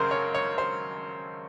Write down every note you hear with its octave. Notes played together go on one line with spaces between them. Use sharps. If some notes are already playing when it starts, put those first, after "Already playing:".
Already playing: G#1 F#2 C#3 G#4 A#4 C5
C#5
C#5
C5